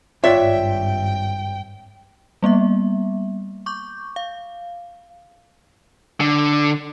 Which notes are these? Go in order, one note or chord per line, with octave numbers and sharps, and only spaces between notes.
G#1 G2 F4 C#5 D5 E5 G5
G3 A#3 B3 E5
C#6 D6 G6
F5
D3